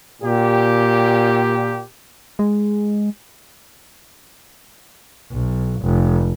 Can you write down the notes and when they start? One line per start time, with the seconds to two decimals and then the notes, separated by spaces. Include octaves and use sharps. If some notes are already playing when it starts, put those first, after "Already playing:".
0.22 A#2 G4
2.39 G#3
5.32 B1
5.82 F1